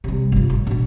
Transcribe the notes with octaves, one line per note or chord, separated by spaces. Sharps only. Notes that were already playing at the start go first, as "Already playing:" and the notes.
C3 G3
G1 F4
A1
B2 D4